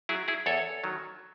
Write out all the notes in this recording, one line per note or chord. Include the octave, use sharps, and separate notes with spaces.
F#3 E4 G#4
E4 G#4
E2 A4 C#5
D#3 F#3